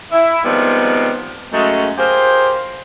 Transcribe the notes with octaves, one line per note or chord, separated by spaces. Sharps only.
E4
D#3 F3 G3 G#3 B3 C4
F#2 G#3 A3
F4 G4 G#4 A#4 C5